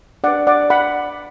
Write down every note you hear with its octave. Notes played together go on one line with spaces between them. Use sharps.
D4 B4 D5 F#5
D5 F#5
F#5 B5